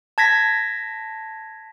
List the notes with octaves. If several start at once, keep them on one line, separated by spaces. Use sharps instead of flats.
A5 G#6 A#6 B6